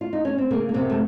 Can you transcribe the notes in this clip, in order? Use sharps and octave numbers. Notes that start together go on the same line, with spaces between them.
F4
D#4
C#4
C4
C#3 A#3
A#3
F#2 C3 C4
A3